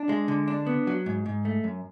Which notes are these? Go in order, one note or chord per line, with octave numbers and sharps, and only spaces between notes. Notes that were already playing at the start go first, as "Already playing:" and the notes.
Already playing: D4
G#3
D3
D4
B3
F#3
G#2
G#2
A3
F#2